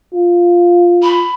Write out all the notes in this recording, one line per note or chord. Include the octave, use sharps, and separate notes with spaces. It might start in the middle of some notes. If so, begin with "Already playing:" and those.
F4
B5